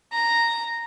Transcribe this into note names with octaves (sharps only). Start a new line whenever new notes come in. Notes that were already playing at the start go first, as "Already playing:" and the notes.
A#5